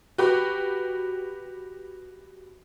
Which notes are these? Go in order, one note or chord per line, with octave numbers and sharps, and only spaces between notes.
F#4 G4 B4